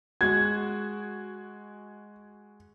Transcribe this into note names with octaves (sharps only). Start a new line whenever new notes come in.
G#3 F#4 G#6